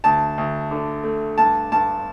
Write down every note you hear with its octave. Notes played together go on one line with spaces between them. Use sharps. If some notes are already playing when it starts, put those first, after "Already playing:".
D2 A5
D2
D3
A3
G2 A5
G2 A5